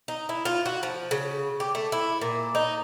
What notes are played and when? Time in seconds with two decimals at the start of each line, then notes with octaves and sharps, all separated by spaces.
0.08 D#4
0.29 E4
0.45 F4
0.66 F#4
0.83 F3
1.11 C#3
1.60 G4
1.75 A3
1.92 E4
2.21 A#2
2.55 D#4